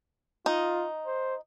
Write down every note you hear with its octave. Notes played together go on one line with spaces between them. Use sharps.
D#4 F4
C5